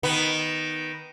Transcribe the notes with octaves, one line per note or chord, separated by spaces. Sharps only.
D#3 B3